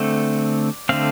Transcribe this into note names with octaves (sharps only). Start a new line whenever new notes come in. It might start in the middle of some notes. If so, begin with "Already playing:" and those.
Already playing: D3 A3 C4 D5
D3 A3 C4 F5